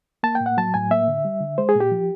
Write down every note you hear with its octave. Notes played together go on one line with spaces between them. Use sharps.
A#3 A5
G5
A2
F#5
F#3 A5
A2 G#5
A#3 E5
D3
G3
D3
G#3 C5
G#4
A#2 G4
F3